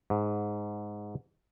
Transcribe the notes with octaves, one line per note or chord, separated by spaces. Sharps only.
G#2